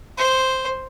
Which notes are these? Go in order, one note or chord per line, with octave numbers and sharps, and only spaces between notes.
C5